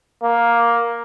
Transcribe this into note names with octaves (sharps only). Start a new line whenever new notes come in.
A#3